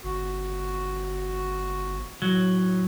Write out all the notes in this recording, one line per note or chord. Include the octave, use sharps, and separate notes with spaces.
G1 F#4
A2 F#3